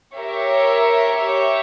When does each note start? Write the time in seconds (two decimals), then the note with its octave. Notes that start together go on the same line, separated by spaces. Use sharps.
0.16 G4 A#4 C#5 E5
1.17 G4 C#5 E5